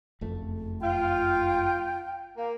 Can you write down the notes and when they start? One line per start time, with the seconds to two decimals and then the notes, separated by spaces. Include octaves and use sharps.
0.21 F#1 F2 A3
0.81 F4 G5
2.37 A#3